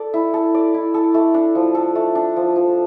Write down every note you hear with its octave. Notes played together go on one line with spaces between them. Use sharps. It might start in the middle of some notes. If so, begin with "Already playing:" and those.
Already playing: A4 D5
E4
A4
D5
E4
A4
A3
D4
F3
A4
A3
D4
F3
F3